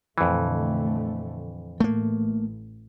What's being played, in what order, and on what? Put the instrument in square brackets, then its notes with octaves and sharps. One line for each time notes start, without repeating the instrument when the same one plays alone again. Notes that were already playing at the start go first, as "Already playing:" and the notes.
[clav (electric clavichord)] F2 E3 [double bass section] A#2 D3 A3
[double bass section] A1 [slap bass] A3 A#3